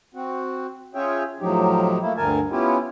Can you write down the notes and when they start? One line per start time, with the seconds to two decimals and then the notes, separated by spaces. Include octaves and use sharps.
0.14 C4 F#4
0.95 C#4 F4 G#4 C#5 E5 G5
1.41 A2 F3 F#3 D#4 G4
2.02 A3 A#3 E4
2.17 D2 G2 D3 A#4 G#5 A5
2.51 B3 C#4 E4 F4 G4